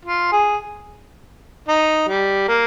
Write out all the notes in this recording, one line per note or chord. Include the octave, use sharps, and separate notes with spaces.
F4
G#4
D#4
G3
A#3